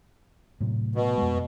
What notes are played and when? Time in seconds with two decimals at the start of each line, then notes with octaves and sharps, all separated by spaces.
0.60 A2 C3 F#3
0.95 B2
1.18 F2 G#3